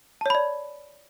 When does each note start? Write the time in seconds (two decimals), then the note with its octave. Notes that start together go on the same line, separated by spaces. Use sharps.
0.21 A5
0.26 C#5
0.30 B5
0.35 D5